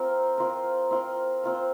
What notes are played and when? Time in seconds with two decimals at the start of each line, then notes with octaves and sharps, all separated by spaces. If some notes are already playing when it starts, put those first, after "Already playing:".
Already playing: C4 F4 A#4
0.38 C4 F4 A#4
0.91 C4 F4 A#4
1.44 C4 F4 A#4